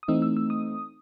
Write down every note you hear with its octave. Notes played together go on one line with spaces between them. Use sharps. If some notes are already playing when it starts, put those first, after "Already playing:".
D#6
E3 A3 C4 D#4 E6
E6
E6
D#6